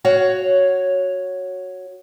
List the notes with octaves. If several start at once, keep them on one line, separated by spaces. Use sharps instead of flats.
F#4 C#5 F5